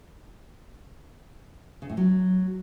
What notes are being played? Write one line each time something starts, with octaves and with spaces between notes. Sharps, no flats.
C#3
A2
F#3